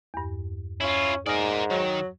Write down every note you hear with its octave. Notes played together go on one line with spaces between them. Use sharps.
E2 G2
C#4 E4 F4
G#2 D#4 A#4 D5 G#5 D#6 F6
D#3 F#3